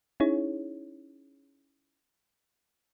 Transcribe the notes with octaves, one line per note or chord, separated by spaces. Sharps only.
C#4 D#4 E4 G#4 C#5